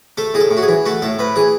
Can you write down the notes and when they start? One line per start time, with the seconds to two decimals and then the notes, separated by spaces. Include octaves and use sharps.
0.17 A3 A4
0.34 A2 G#4
0.40 A4
0.51 A2
0.57 F#4
0.62 G#4
0.68 E3
0.86 A3 F#4
1.02 A2 A4
1.19 A2 B4
1.36 E3 G#4